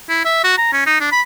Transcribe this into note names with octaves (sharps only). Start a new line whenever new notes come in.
E4
E5
F#4
A#5
C#4
D#4
D4
B5